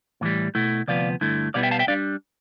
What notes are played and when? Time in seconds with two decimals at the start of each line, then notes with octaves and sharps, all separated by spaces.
0.21 A2 E3 G3
0.55 B2 A3 E4
0.87 D2 C3 F3 B3 D5 F5
1.21 G2 D3 A3 E4
1.54 B2 G3 B3 E4 D5 F5
1.63 E5 G5
1.71 F5 A5
1.79 E5 G5
1.88 G3 D4 D5 F5